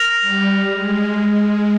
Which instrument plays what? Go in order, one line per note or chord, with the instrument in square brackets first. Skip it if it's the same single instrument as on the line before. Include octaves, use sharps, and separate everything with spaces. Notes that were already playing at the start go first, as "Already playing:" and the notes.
Already playing: [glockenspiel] F6 A#6 F7
[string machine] G3
G#3